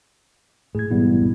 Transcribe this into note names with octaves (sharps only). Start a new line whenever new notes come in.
A2 G#4 G#6
A1 G#2 B2 G3 B3 E4
F2 B2